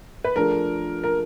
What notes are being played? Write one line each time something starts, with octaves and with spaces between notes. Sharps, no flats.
B4
F3 A3 D4 F4 G#4 A#4
A#4